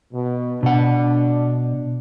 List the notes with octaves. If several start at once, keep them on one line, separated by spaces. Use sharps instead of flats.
B2
B2 D4 F#5